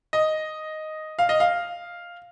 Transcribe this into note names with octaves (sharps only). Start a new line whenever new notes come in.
D#5
F5
D#5
F5